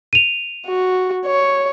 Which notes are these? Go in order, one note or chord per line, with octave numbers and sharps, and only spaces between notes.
D#7 F7
F#4
C#5